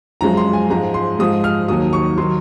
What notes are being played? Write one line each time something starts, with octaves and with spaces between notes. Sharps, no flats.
F#2 F3 G#3 A#5
C6
G#5
G#2 F3 G#3 A#5
C6
G#2 F3 G#3 D#6
F6
D#2 D#3 F#3 D#6
C#6
D#3 F#3 C6